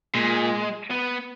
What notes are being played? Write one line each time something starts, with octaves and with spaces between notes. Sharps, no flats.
A#2 G#3
B3